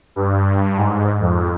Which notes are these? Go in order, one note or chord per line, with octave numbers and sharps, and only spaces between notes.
G2
G#2
F2